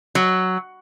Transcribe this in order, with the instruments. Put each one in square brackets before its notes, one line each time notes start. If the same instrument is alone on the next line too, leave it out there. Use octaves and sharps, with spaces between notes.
[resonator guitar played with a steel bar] F#3